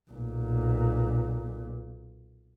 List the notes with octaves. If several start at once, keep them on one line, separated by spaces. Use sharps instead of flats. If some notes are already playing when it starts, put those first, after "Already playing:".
B1 A#2